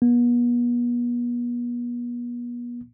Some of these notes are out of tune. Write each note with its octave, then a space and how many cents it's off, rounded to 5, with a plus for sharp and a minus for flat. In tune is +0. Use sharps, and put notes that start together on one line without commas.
B3 -40